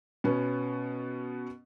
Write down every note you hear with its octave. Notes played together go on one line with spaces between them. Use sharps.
B2 B3 C#4